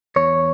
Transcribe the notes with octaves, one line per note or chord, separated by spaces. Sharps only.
E2 C#5